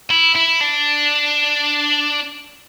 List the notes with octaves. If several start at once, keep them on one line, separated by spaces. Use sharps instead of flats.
E4
E4
D4